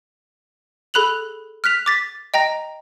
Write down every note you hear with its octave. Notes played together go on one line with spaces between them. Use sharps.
G#4 A4 B5 F#6 F7 F#7
F6 F#6 B6 F7
D6 A6 B6
D#5 G5 A#5 A#6